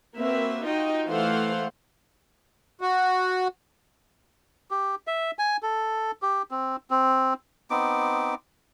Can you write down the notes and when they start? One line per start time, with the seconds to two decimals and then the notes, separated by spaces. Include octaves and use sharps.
0.17 A#3 C4 F#4 B4 E5
0.65 D#4 F4 F#4 D#5 G5
1.07 E3 A3 C5 F5 F#5
2.81 F#4
4.71 G4
5.07 E5
5.39 G#5
5.63 A4
6.22 G4
6.51 C4
6.90 C4
7.70 B3 C4 D#4 D6